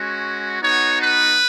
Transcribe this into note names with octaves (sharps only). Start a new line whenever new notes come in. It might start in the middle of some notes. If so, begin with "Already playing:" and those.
Already playing: G#3 C#4 F#4
B3 D#4 F#4 C#5
B4